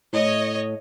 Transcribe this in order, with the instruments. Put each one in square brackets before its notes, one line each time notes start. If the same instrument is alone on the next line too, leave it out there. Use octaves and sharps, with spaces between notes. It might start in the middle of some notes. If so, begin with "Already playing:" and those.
[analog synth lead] A2 [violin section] C#5 D#5